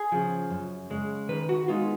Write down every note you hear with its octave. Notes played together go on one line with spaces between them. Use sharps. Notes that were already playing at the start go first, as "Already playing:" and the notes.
Already playing: G#4
C#3 F3
F#2
C#3 G#3
D#3 B4
F#4
G#3 B3 D#4 F4